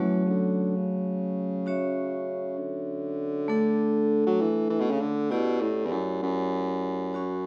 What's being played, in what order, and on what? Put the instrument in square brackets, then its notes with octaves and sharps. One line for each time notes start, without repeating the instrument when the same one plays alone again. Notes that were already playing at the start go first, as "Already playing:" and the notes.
Already playing: [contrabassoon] E3 [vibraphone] F#3 A3 C#4 F#4 C#5
[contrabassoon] C#3
D3
C#3
[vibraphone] C#4 F#4 C#5 E5
[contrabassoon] D3
[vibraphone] A3 D4 A4
[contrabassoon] F#3
E3
E3
B2
C#3
D3
[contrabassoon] B2 [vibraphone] C#4 E4 G4 D5
[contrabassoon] A2
E2
F#2
F#2
[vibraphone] C#4 F#4 C#5